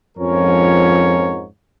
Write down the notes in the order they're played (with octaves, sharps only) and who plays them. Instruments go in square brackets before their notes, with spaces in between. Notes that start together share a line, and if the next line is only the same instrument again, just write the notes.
[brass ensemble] F2 G#2 F3 C#4 A#4 C#5